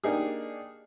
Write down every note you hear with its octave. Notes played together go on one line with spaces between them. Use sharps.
A#3 D4 D#4 G4 G#4